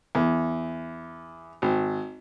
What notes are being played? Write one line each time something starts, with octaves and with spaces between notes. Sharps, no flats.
E2
G#1